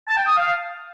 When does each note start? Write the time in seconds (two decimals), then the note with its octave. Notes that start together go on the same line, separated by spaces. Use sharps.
0.08 A5
0.17 G5
0.27 D#6
0.36 F5